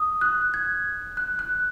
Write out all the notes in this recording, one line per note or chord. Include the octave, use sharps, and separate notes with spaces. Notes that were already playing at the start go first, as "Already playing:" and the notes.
Already playing: D#6
F#6
G#6
F#6
F#6